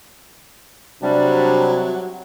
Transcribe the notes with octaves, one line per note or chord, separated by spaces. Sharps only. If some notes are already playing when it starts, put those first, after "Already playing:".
C3 F#3 G3 D4